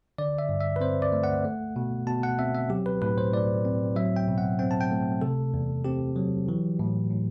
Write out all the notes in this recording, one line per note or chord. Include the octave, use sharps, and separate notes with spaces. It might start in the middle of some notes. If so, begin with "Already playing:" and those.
D3 D5
E5
G2
E5
B4
C4 C5
D5
A3
F#5
A3
B2
B2 A5
F#5
C4 E5
E5
F#3 G4
B4
A2 B4
C5
A2 D5
C4
F#3 E5
G5
B2
F#5
C4 G5
A5
G5
A3
C3 A4
E2
C4 G4
F#3
E3
A2
A2